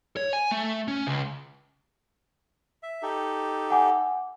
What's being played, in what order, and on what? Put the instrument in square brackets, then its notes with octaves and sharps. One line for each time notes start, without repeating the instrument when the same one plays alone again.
[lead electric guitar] C#5
G#5
A3
C#4
C#2
[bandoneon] E5
D#4 G4 A4
[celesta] F#5 G#5 D6